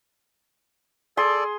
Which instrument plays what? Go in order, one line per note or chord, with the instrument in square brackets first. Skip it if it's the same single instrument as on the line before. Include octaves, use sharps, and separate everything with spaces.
[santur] G#4 C6 D#6 [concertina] A4 D5